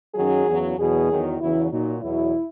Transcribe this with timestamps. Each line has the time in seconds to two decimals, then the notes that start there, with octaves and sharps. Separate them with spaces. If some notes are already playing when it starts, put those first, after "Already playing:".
0.15 F#2 D#3 F#3 G#4
0.47 E2 C#3 F#3
0.77 E2 B2 F#3 G#4
1.08 E2 D#3 F#3
1.40 E2 C#3 F#3 E4
1.71 A#2 F#3 D#4
2.02 E2 B2 F#3 E4